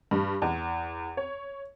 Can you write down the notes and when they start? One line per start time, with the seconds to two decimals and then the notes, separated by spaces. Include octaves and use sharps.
0.11 G2
0.42 E2
1.17 C#5